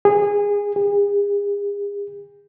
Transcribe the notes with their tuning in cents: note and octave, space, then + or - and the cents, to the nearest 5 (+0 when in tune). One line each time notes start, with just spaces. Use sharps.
G#4 -20
G#4 -40